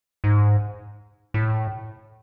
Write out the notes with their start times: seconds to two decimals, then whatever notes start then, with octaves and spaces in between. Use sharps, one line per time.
0.24 G#2
1.34 A2